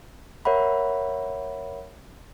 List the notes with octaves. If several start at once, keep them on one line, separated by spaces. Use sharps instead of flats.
A#4 C#5 E5 F#5 B5